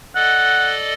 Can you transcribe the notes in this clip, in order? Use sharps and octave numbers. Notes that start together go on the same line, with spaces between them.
A4 D5 D#5 F#5